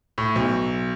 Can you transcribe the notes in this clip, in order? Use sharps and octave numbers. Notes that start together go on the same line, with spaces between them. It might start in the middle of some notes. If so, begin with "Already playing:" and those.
A2
B1